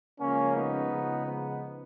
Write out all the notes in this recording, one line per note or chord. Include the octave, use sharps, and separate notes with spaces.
C#3 F3 G#3 A#3 C#4
B3 D#4
C#3 F3 G#3
B3